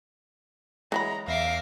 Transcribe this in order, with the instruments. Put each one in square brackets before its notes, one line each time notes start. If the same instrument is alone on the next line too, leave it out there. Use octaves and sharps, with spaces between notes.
[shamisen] E3 F#3 B5 [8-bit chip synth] G#3 [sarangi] A#5
[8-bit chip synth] E2 A#6 C7 [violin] E5 D6 [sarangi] F5